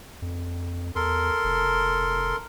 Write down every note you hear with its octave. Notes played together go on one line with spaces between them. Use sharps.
F2
E2 A4 A#4 C6
F1